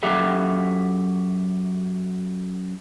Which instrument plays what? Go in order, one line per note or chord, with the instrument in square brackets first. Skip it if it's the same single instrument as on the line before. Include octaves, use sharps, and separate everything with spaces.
[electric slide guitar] F#2 G4 A4 E5 F#5